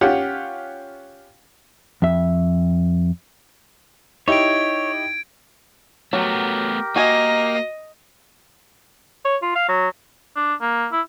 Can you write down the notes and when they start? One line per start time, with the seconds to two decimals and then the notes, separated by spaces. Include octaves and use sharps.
0.01 C#4 F4 G4 F#5
2.02 F2 E5
4.28 D#4 E4 G4 C#5 G#6 D7
6.13 F#3 A3 B3 G4 A#4
6.96 A#3 F#4 D#5 G#5
9.25 C#5
9.42 F4
9.55 F5
9.68 F#3
10.36 D4
10.61 A#3
10.92 E4